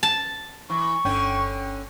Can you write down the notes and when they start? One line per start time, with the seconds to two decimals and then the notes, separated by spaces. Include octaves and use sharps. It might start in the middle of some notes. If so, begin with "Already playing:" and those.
0.03 A5
0.70 E3 C#6
1.05 G1 D3 C#4 G5